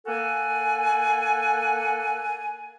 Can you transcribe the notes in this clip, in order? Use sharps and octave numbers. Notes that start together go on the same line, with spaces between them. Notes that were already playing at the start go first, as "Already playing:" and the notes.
A#3 A4 F#5 G#5